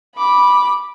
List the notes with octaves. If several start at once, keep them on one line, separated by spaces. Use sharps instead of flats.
B5 D6